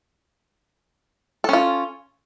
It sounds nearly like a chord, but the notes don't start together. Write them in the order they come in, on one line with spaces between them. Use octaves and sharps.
A4 C#4 F4